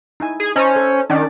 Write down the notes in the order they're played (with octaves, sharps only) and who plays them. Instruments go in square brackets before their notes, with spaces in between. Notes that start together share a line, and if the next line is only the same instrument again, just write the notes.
[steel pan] D#4 E4 G#5
[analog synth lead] G#4
[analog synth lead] C#4 [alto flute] C5 [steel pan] D#5 A5 A#5
[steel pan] A4
[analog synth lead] D#3 [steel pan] C#4 D4 D5